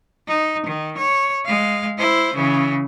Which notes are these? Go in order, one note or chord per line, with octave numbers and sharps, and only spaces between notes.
D#4
D#3
C#5
G#3 F5
E4 C5
C#3 E3